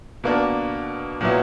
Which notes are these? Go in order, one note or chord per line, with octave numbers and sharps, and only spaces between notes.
B2 A#3 D4
A#2 F#3 B3 E4